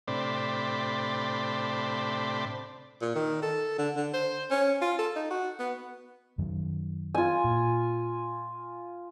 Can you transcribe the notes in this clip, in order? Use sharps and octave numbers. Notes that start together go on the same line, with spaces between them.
A2 C3 D4 C5 D5 B5
A#2
D#3
A4
D3
D3
C5
C#4
F4
A4
D#4
F#4
B3
F#2 D#3 F#3
F4 G#5
A#2